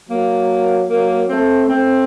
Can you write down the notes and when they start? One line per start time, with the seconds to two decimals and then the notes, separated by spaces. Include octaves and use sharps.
0.09 F#3 A#3
0.88 F#3 A#3
1.28 A3 C4
1.67 A3 C4